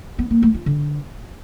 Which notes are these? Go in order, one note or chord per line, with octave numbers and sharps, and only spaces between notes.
B3
A#3
A3
F4
D3